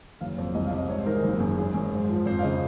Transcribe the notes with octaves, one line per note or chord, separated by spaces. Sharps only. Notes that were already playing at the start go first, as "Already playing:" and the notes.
F#1 F5
F2
C2 D#5
F5
C3
D#5
G#2 C#5
C5
D#3 A#4
G#4
F#1
F#2
G#1 G#4
F#2
G#2 C5
F3
F2 C5
F5
C#3 D#5